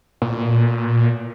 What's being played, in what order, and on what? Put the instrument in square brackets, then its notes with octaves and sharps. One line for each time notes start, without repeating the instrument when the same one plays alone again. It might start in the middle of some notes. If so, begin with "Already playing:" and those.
[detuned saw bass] A#2